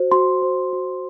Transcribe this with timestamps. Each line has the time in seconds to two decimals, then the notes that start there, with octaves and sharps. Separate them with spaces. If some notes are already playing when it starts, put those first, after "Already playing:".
Already playing: F#4 C5
0.12 F#4 C6
0.42 C5
0.73 F#4